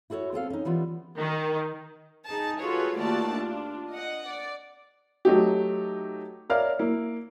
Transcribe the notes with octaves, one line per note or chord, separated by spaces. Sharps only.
E4 F#4 A4 B4 C#5
B3 C4 A4 F5
C#4 D#4
E3 G3 B3 F4
D#3
D#4 G#4 A5
F4 F#4 G#4 A4 B4 C#5
D#2 A3 F4 F#4 D5 A5
D4 F4
D#5 F#5
D5
F#3 A3 D#4 G4
A#4 C#5 D5 E5 F5 F6
A#3 E4